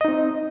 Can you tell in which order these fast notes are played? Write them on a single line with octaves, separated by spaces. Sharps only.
D#5 D#4 C4